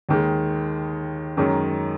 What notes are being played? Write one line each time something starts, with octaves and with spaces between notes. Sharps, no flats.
D#2 D#3 G#3
F#2 D#3 G#3 C#4